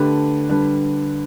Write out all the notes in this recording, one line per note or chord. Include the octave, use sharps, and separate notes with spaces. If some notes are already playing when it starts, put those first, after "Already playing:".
Already playing: D3 A3 D4 G4 B4
D3 G3 D4 B4